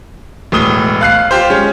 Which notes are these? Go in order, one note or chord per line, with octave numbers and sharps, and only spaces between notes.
E1 A2 D#6 G7
F5 F#6 C7
F4 G4 C5
G#3 C#4